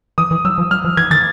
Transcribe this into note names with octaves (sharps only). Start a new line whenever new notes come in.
E3 D#6
E3
F#3 E6
F3
F#3 F6
F3
E3 G#6
D#3 A6